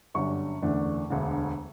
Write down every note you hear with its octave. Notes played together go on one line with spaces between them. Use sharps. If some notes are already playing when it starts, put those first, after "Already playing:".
G1 F#2 D3 G3 C#4 C#6
F#1 E2 D3 A3 D4
E1 D2 D3